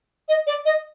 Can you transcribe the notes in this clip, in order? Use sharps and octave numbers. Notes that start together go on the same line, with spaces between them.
D#5
D5
D#5